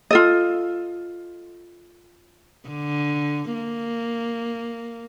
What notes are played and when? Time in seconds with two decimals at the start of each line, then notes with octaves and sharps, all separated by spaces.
0.11 F4 A4 D#5
2.69 D3
3.54 A#3